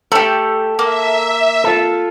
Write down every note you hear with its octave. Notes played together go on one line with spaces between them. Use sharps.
A3 G4 A4
A#3 E5
F4 A4